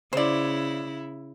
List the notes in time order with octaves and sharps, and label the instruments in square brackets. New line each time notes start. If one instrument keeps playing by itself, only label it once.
[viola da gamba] C#3 E4 [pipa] C5 D5